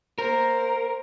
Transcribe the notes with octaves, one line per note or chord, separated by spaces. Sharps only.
A#3 A#4 C5